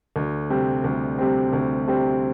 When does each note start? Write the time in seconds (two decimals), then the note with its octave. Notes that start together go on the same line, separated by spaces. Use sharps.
0.16 D2
0.50 C3 G3 C4
0.84 D2
1.18 C3 G3 C4
1.53 D2
1.87 C3 G3 C4